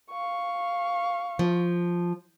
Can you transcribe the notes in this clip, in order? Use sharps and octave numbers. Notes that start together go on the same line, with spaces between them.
F5 C#6
F3